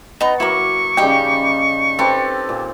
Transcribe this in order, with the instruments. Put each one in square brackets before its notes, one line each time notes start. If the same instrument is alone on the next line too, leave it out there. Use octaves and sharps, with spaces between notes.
[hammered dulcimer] B3 [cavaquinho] D#4 A#5
[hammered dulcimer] F#3 A#3 D6 [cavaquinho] E4 A#5 [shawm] C#6
[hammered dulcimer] C#3 G3 D#4 [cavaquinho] G4 G5
[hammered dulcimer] C4 A4 B4 [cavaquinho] G4
[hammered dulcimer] A#2